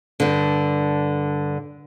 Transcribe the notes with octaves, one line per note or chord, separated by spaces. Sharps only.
G2 D3